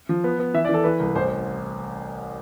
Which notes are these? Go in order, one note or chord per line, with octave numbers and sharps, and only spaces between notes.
F3
B3
B3
E3 E5
D5
E3 A4
E3 B4
C2
A1 C5